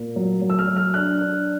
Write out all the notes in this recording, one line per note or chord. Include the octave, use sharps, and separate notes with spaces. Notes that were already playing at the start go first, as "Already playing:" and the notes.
Already playing: A#2 A#3
F#3
F#3
E6
F6
F#3
F6
D4 F#6
D4